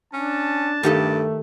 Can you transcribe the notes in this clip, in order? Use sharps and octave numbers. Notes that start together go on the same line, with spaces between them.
C#4 D4 A5
G2 D#3 A3 G4 A4